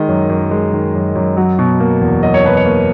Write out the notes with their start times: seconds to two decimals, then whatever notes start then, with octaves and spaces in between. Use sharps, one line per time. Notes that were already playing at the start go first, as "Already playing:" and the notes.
Already playing: D#3 G#3 D#5
0.08 F#2
0.29 F#2
0.51 G#3
0.73 D#3
0.94 F#2
1.15 F#2
1.37 F#3
1.59 B2
1.80 A#3
2.01 E2
2.23 F#3 D#5
2.34 C#5
2.44 B2 B4
2.57 C#5
2.65 A#3